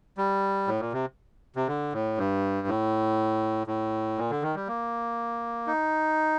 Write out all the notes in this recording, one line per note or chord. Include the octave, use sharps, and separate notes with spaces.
G3
A2
A#2
C3
C3
D3
A2
G2
A2
A2
A#2
D3
D#3
G3
A#3
D#4